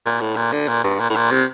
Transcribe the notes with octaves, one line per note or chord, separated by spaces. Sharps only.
A#2
A2
A#2
D3
A#2
G2
A#2
A2
A#2
C3